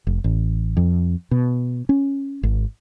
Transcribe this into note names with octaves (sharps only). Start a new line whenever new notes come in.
F1
A1
F2
B2
C#4
G#1